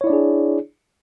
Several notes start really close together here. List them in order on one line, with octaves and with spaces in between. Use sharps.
C#5 E4 D5 D4 G#4